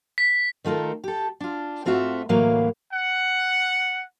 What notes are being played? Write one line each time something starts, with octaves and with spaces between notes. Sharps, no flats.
B6
D#3 A3 F4 A4 A#4
G4 A4
D4 F4
G#2 A3 C4 F4 F#4 E5
D2 A2 E3 F#3 A#3 F5
F#5